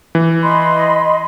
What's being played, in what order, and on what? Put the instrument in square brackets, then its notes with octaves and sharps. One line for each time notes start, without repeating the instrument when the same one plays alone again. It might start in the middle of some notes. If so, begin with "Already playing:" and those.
[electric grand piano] E3
[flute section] D#5 B5 C6